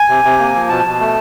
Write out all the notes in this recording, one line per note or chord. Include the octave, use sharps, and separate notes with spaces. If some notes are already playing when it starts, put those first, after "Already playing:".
Already playing: G#5
C3
C3
A#3
F3
B2 A5
B2
A3